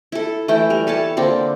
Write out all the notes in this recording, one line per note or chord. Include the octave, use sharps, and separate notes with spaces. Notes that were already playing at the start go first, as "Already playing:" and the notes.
E4 A4
E3 A3 E4 G5
G3 A#4
A4 B4 C#5 A5
D3 A#3 C4 D4